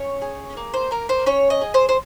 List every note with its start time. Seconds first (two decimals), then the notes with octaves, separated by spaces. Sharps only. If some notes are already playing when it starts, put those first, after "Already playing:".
Already playing: C#4 C#5
0.22 G#4
0.57 A#3
0.74 C5
0.91 A#3 A#4
1.09 C5
1.26 C#4 C#5
1.50 D#5
1.61 G#4
1.74 C5
1.89 C5